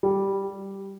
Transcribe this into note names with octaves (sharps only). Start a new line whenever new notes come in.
G3